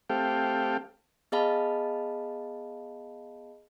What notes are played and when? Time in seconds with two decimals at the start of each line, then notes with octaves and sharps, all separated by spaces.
0.10 A3 C4 G4 A4 F5 G5
1.32 B3 G#4 D#5 F5 A5 B5